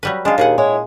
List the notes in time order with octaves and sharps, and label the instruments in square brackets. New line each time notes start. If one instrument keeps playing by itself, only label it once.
[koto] F#3 G3 B4
[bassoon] G#3 [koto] D4 F4
[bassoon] D#2 [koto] A#2 G#4 F#5
[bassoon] G#3 [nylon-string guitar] E4 C#5